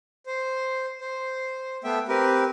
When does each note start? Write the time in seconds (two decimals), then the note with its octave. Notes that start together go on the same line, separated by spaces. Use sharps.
0.26 C5
1.01 C5
1.84 A3 B3 E5 G5
2.08 C4 G4 A#4 B4